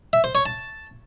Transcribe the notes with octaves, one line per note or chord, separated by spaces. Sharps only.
E5
C5
C#5
A5